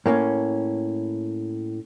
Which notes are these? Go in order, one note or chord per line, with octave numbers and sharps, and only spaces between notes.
A2 A#3 C#4